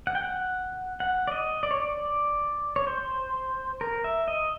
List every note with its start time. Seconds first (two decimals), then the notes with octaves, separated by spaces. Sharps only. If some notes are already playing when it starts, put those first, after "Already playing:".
0.07 F#5
0.15 G5
0.23 F#5
1.00 F#5
1.27 D5
1.31 D#5
1.63 D5
1.71 C#5
1.80 D5
2.76 C#5
2.87 C5
3.81 A#4
4.04 E5
4.28 D#5